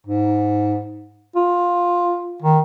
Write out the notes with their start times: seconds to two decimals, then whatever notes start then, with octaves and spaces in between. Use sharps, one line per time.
0.07 G#2
1.36 F4
2.42 D#3